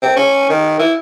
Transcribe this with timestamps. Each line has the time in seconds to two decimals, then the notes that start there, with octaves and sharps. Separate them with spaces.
0.02 C4
0.17 C#4
0.49 D#3
0.79 E4